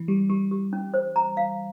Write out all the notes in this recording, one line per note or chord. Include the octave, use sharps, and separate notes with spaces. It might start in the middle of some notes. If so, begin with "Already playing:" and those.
Already playing: E3
G3 G4
G3 G4
G4
C#4
C5
A#5
F5